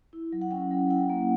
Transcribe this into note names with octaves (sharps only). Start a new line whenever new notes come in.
E4
F#3
F#5
C#4 G5
F#3
E4 F#5
A#3